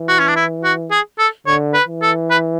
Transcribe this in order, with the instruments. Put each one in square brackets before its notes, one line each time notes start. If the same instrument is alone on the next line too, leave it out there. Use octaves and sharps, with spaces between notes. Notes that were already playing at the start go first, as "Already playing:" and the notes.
Already playing: [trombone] E3
[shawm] F#4
C#4
D4
E4
F#4
G#4
A4
[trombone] D3 [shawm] C#5
[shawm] B4
[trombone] E3
[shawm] A4
B4